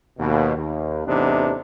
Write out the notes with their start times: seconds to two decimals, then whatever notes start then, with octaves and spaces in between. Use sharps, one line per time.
0.19 D#2 B2
0.57 D#2
1.06 A1 E2 C3 B3 D4 D#4